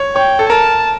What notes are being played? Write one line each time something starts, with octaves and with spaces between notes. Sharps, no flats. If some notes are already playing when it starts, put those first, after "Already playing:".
Already playing: C#5
C#5 G5
A4
A#4 A5